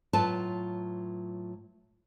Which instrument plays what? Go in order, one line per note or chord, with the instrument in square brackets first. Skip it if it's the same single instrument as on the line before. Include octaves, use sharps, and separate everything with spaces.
[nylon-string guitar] A2 F#3 F4 B4 A5